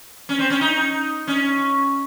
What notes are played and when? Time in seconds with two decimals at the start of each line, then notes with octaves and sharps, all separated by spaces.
0.29 C#4
0.39 C4
0.50 C#4
0.61 D#4
1.27 C#4